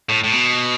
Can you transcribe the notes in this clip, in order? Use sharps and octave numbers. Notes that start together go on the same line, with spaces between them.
A2
A2
B2